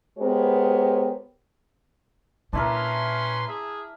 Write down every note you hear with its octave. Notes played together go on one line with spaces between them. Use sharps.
G#3 B3 G4 A#4 C5 C#5
A#2 C#4 D4 E4 A#4 B4 C6
G#4 E5